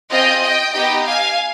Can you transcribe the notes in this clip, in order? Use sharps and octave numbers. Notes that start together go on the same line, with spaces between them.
C4 F4 G#4 D#5 G5
D#5 G5
B3 D#4 G4 D#5 G5
F5 G#5